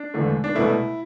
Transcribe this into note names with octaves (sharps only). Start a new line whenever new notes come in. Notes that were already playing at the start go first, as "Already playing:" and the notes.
Already playing: D4
E1 E2 D3 A3
D4
C2 B2 A3 E4